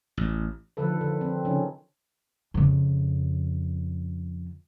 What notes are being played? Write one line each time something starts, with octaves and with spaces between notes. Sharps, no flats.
A1
D3 D#3 F3 A4 B4
D3
C4
C#3 F3 C#4 D#4
F2 C#3